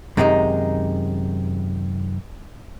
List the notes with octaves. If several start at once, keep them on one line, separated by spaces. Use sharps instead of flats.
F#2 C3 D#3 G#3 B3 D#4